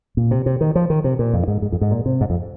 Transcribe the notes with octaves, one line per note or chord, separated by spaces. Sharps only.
A#2
C3
C3
D#3
F3
D#3
C3
A#2
F2
G#2
G#2
F2
G#2
A#2
C3
G#2
F2